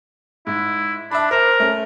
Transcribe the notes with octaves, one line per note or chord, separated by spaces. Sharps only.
G#2 E4
D4 E5 A5 B5
A#4 C5
A3 C#4